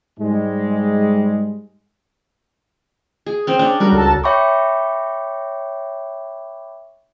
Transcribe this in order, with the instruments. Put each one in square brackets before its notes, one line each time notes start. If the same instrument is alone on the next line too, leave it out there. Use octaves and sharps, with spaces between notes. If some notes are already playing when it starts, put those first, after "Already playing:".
[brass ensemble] G#2 G3 G#3
[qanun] G#4
C4 C#4
C#4 D4
[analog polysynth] G3 [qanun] F#4 A#4
[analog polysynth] C#2 A4 A5
[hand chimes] C#5 E5 G5 B5 C#6 D6